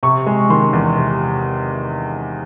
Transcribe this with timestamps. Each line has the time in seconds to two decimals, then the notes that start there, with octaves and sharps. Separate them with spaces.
0.03 C3 C#6
0.26 G#3
0.50 D#3 C6
0.73 E2
0.97 C3